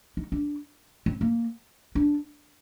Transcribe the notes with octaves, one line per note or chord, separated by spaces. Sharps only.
D#4
D4
C4
A#3
D4